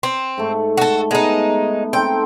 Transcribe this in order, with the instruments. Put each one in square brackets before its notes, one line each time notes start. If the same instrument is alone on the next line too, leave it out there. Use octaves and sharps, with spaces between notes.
[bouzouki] C4
[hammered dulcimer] G#2 A3
[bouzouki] F#4 A4
[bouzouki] G#3 D#4 [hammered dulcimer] B3
[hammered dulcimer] C4 D#4 A4 [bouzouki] G5